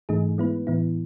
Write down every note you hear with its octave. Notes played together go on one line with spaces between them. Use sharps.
G#2 E3 A3 D#4 G#4
G#3 B3 E4 B4
A2 E3 B3 E4